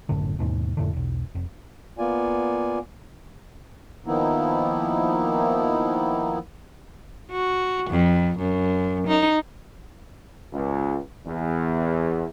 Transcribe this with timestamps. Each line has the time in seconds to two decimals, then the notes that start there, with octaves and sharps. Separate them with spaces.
0.09 G#1 F#2 A2 D3
0.39 D#2 G#2 B2
0.77 F2 A2 D3
0.93 E1 B1
1.35 F1
1.98 A#3 B3 F4 D5 G#5
4.07 D#3 F3 A#3 B3 D#4 E4
7.31 F#4
7.90 F2
8.39 F#2
9.08 D#4
10.52 C#2
11.27 E2